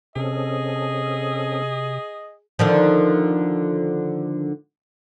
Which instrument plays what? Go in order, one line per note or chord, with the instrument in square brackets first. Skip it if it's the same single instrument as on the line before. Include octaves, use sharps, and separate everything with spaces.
[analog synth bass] C3 [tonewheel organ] C4 C#4 A4 [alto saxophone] G#4 [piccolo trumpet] D#5
[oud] D3 D#3 F3